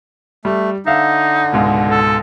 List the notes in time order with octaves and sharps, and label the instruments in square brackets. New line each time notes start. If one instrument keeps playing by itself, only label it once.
[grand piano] G3 [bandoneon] A3
[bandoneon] D3 [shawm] D#4 [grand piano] E5 F5
[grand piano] C#2 G#2 B2
[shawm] A4